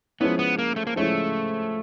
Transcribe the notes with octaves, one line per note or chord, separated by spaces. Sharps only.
F3 G#3 B3 C#4 E4
B3
A#3
A3
A#3
F3 G#3 A3 C#4 E4